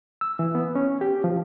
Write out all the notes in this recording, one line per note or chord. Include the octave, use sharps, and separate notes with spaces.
E6
E3
B3
C#4
G4
F3